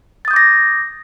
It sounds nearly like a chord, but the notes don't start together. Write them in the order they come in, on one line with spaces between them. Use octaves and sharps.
A6 D#6 G6 D6 A#6